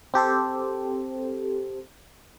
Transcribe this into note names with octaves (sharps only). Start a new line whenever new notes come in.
C4 G4 A4 C5